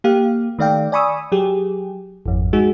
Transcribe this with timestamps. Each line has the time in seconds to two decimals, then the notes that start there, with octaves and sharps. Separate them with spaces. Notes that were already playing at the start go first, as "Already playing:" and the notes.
0.04 A#3 G4 F5
0.59 D#3 A3 D5 F5 G5
0.92 D5 G#5 B5 C#6 D#6 E6
1.32 F#3 G4 G#4
2.26 G#1 F2
2.53 G#3 D#4 F#4 G#4